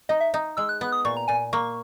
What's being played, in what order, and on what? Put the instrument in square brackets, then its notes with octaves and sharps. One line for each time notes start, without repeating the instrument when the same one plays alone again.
[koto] D#4 [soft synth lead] D#5
[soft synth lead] E5
[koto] D#4
[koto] G#3 [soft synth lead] E6
[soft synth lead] F#6
[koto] B3 [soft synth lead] F#6
[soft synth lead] D#6
[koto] A#2 [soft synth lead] C#6
[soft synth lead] A#5
[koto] A#2 [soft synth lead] G#5
[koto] A#3 [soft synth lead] C#6